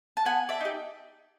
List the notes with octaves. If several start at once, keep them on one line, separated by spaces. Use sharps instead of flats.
A5
B3 F#5 G#5
D5 E5
D#4 G4